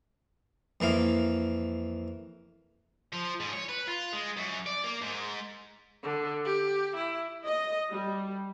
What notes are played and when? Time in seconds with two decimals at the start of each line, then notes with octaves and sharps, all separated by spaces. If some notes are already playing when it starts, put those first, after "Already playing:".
0.80 F2 E3 A#3 F5
3.13 F3
3.40 G#2
3.53 C#5
3.69 B4
3.88 F4
4.13 G#3
4.37 F#2
4.66 D5
4.84 A#3
5.01 G#2
6.03 D3
6.45 G4
6.97 E4
7.45 D#5
7.92 G3